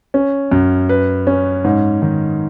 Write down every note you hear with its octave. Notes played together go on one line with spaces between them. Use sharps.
C#4
F#2
B4
C#4
G#2
D#3